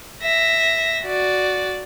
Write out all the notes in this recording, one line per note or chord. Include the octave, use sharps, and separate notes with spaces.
E5 A#6
F#4 D5